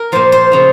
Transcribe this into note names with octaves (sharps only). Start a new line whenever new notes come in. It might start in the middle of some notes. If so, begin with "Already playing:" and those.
Already playing: A#4
A#2 F3 C5
C5
C#3 F3